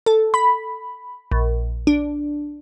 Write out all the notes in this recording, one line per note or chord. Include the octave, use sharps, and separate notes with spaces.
A4
B5
A#1
D4